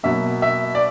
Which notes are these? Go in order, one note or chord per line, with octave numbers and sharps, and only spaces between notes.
B2 F#3 A#3 E5
E5
D5